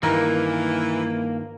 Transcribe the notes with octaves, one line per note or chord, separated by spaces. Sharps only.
G2 D#3 E3 A#3 A#4